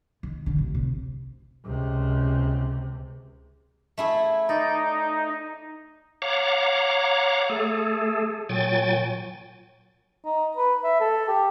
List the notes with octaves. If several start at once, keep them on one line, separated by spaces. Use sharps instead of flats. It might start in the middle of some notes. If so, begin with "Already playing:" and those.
D#3
D3
A1
C3
C#2 C3
A3 E4 G#4
D#4 D5
C#5 F5 F#5 A#5 D6
A3 G#4 A4
A#2 F#3 G5 G#5 A6
D#4
B4
E5
A4
G4